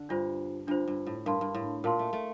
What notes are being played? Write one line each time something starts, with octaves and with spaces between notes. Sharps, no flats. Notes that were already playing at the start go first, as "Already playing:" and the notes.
Already playing: D3
G2 D4 F4 C5
G2 D4 F4 C5
G2
A2
G2 A#4 F5 A5 C6
G2
A2
A#2 A#4 F5 A5 C6
A3
A3